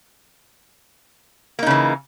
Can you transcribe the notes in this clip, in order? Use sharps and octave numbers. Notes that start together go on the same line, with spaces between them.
C#3 E3 A#3 D#4